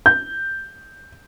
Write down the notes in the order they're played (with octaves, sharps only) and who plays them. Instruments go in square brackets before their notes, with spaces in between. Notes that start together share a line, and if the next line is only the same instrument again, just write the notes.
[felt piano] G6